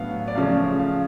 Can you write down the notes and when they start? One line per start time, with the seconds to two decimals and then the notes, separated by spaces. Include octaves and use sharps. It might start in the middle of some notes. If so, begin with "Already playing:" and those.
Already playing: A2 F#3 B3 D4 F5
0.28 D5
0.35 C#3 F3 A3 C#4 F5
0.79 F5